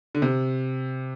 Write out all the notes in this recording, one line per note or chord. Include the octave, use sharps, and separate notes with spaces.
D3
C3